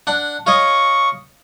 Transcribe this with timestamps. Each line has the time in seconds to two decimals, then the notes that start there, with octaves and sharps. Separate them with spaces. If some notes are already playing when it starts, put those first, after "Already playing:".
0.07 D4 F#5
0.47 F4 C#5 D#5 C#6